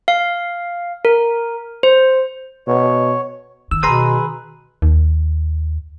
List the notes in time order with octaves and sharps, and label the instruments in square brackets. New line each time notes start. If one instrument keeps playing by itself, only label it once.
[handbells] F5
A#4
C5
[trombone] B2 [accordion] C#5
[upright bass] D#3 [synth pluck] E6
[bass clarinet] B2 [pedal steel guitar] G#4 B4 E6 [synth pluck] A#5 C6 D#7
[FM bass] D#2